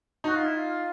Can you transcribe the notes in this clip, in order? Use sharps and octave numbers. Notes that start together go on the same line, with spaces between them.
D#4 F#4
F4
E4
F4